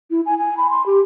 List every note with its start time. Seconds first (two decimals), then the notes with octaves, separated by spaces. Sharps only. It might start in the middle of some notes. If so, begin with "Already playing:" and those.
0.11 E4
0.26 G#5
0.38 G#5
0.57 B5
0.70 C6
0.86 G4